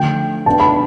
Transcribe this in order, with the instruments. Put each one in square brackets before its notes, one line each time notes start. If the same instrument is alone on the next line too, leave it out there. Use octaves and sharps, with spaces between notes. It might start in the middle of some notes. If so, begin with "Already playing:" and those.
Already playing: [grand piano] D3 F3 A3 [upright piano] G5
[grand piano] B2 B3 D4 [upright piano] A5
[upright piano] B5